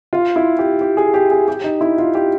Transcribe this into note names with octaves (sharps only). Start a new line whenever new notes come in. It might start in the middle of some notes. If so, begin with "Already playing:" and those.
F4
E4
G4
G4
G#4
G4
G#4
G4
D#4
E4
F4
G4